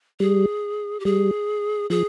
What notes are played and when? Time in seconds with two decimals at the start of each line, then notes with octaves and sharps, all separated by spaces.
0.20 G3 G#4
1.00 G4
1.05 G3 G#4
1.90 F3 G#4